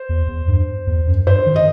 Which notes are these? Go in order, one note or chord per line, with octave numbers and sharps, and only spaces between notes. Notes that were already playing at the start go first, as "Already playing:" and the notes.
Already playing: C5
E2
E2
G2
E2
F#2
G2 C5
D#3
D#5